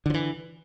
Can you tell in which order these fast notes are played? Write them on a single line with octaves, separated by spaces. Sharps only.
D3 F3 E3